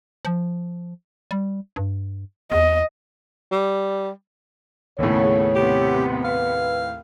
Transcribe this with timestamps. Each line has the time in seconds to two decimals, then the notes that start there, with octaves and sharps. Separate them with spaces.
0.25 F3
1.31 G3
1.76 G2
2.51 E2 D#5
3.52 G3
4.99 D#2 A2 C#3 B3 A4 C#5
5.55 C3 B3 G4
6.24 B4 F5